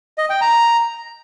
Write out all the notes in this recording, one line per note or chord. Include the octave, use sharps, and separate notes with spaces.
D#5
G5
A#5